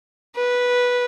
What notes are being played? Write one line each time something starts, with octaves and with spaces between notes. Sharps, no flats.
B4